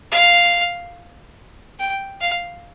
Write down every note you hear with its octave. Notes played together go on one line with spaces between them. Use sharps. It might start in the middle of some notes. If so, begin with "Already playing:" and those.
F5
G5
F5